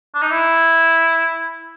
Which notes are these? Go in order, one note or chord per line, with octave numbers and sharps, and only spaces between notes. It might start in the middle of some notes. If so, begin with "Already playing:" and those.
D4
D#4
E4